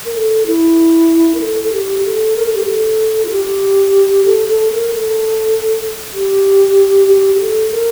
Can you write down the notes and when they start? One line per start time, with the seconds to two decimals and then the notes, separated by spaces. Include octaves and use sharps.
0.05 A#4
0.15 A4
0.47 E4
1.35 A#4
1.41 A4
1.64 A4
1.72 G4
1.99 G4
2.04 A4
2.36 A#4
2.46 A4
2.55 G4
2.65 A4
3.25 F4
3.30 G4
4.25 A4
4.49 A4
4.72 A#4
4.95 A4
6.14 G4
7.08 G4
7.35 G4
7.40 A4
7.71 A#4